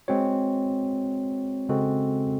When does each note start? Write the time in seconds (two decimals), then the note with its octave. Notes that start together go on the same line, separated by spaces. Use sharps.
0.08 G#3 C4 F#4 C#5
1.69 C#3 G#3 C4 F#4 A4